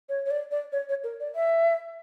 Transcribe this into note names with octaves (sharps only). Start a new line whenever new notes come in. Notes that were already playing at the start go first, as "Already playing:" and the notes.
C#5
C#5
D5
D5
C#5
C#5
A#4
D5
E5